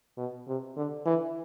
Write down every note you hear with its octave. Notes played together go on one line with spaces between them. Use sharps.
B2
C3
D3
E3